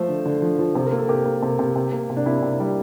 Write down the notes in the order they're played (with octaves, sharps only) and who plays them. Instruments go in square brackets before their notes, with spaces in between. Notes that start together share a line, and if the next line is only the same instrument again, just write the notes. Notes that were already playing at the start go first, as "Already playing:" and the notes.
Already playing: [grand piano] F3 A3 A4 C5
D3
D3
F3
F3
C3 C5
A#4
A#3
A4
C3 G4 A#4
A#3
C3
C3
C3
A#3
C3
D4
C3 E4
C3
G3